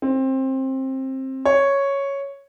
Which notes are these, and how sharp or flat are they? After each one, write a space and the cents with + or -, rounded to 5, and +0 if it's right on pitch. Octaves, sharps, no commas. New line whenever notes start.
C4 +20
C#5 +0